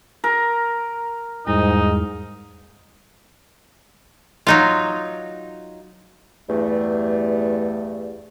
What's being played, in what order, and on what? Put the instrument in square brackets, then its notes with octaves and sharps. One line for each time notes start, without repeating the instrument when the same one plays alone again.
[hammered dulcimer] A#4
[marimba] E2 G3 [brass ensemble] G#2 [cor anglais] D#4
[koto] F#3 D#4 F4
[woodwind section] E2 G2 A3